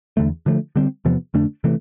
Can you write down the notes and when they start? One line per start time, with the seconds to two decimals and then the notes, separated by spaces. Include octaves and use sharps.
0.17 E2 D3 A3
0.46 D3 F3 A3
0.76 D3 G3 C4
1.05 E2 C3 F3 B3
1.34 F2 D3 A3 D4
1.64 C3 E3 A3